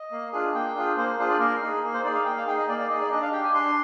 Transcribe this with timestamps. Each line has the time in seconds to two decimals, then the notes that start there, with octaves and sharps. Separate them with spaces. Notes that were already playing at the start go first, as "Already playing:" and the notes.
Already playing: D#5
0.12 A#3
0.33 D4 F4 G#4
0.55 A#3 G5
0.75 D4 F4 G#4
0.96 A#3 C5
1.19 D4 F4 G#4 C5
1.30 D5
1.39 A#3 A#4
1.62 D#4 G#4
1.83 A#3
1.94 C5
2.04 D#4 G#4 D5
2.15 F5
2.25 A#3 G5
2.37 F5
2.46 D#4 G#4 G5
2.57 D#5
2.68 A#3 D5
2.79 D5
2.90 D#4 G#4 D#5
3.01 D5
3.12 D4 D#5
3.22 F5
3.32 G4 G5
3.43 G#5
3.54 D4 C6